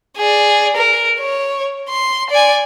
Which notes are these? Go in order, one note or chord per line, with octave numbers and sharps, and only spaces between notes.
G#4 D5
A#4
C#5
C6
D5 G#5